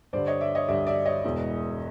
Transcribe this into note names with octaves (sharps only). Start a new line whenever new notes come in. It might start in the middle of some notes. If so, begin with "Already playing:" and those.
G2 D3 G3 C5 D5
C#5 D#5
D5 E5
C#5 D#5
G2 D3 G3 D5 E5
D5 E5
C#5 D#5
E1 E2 B2 G#3